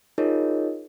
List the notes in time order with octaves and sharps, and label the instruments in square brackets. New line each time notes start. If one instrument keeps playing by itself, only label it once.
[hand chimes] D#4 F4 G#4 A#4 C#5 D#5